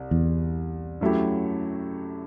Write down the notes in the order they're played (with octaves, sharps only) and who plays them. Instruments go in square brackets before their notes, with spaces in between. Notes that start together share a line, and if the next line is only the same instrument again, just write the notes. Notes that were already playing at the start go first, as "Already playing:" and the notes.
Already playing: [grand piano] C2
[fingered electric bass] E2
[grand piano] F#2 F#3 A3 E4 G4